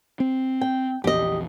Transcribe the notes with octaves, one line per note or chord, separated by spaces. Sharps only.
C4
G5
A#1 E2 G4 D#5